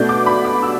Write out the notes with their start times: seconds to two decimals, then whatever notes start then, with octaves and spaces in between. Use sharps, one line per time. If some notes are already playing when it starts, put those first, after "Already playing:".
Already playing: B2 A3 D4 G6
0.09 D6
0.26 B5
0.45 D6
0.63 E6